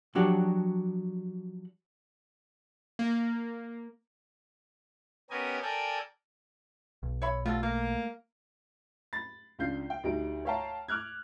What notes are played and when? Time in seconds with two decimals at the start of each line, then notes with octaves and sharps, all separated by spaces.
0.15 F3 F#3 D4 F#4 G4
2.99 A#3
5.30 B3 C#4 G4 A#4 D#5 G#5
5.62 A4 A#4 D5 G5 G#5
7.03 B1
7.22 C#5 E5 B5
7.46 F#3 G3 A3 F4 A4
7.63 A#3 A#4
9.13 B5 A6
9.59 C#2 D4 F4 G6 C7
9.90 G5
10.03 D2 G3 D#4 D7
10.45 C#5 E5 F5 G5 A5 A#5
10.88 D6 F6 F#6 G#6